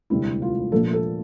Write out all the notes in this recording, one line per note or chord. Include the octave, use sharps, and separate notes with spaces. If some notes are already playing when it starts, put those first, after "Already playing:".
E1 D2 C3 G3 E4
F4
A#1 A#2 F3 A4
A4